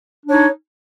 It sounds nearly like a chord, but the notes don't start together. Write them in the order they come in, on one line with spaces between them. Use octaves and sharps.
D4 C#5 D#4